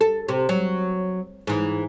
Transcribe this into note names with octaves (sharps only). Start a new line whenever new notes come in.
A4
C3
F#3
G#2 E3